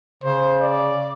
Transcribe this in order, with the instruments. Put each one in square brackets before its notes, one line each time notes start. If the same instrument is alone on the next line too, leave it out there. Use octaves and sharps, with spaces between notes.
[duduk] C#3 [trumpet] C5
[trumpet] D5